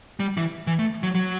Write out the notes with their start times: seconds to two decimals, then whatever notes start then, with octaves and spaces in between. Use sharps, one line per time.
0.20 G3
0.37 E3
0.67 E3
0.79 A3
1.03 F#3
1.15 F#3